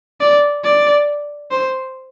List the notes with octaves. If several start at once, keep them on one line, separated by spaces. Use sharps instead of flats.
D5
D5
C5